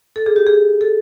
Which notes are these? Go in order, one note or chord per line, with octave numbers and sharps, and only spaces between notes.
A4
G#4
G4
G#4
A4